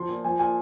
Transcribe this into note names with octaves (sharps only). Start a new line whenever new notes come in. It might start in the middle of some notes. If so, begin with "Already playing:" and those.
Already playing: F3 C6
A#2
F3 G#5
A#2 G#5